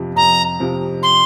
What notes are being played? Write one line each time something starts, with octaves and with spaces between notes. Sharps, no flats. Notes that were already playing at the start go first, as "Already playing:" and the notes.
Already playing: F2 C3 F3
F2 A#5
C3 F3
C6